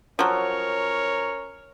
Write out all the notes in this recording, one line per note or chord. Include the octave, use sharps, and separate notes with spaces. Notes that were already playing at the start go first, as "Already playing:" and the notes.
F3 F#3 C#4 A#4 C#5